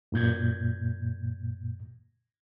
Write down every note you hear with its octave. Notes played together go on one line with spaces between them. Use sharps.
F#2 A#2 G6 G#6